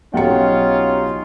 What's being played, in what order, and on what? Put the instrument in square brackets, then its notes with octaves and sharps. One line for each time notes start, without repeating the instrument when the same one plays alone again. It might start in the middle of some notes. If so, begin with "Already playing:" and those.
[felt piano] B1 C#7 [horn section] C#4 D#4 F4 [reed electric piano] G4 F#5 G5